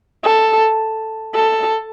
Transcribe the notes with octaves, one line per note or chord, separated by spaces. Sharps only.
A4
A4